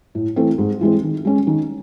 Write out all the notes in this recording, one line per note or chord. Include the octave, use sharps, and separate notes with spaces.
A2
E3 A3 C4
G#2
E3 G#3 C4
D#3
G#3 C#4
D#3